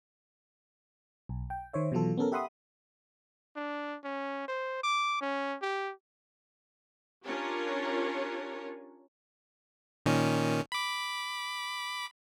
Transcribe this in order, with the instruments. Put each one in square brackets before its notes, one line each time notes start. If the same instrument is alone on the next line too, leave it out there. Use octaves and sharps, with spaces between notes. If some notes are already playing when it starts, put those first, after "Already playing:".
[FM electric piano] B1
G5
D#3 C5 C#5 E5
B2 E3 F#3 F4 A4
B3 C#4 A4 A#4
G4 E5 F#5 B5 C6 D#6
[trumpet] D4
C#4
C5
D6
C#4
G4
[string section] C#4 D4 F4 G4 A#4 C#5
[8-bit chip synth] A#2 D#3 C#4
B5 D6